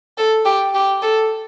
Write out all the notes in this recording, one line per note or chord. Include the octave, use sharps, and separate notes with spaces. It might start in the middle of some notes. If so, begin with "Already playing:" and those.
A4
G4
G4
A4